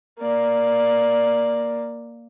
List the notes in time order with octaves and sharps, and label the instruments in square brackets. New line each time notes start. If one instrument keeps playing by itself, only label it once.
[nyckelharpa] A#3 D5